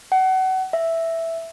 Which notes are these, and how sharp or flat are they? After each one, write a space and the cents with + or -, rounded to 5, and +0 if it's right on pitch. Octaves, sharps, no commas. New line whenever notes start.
F#5 +30
E5 +0